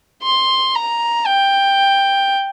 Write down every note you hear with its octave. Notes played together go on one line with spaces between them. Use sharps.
C6
A#5
G5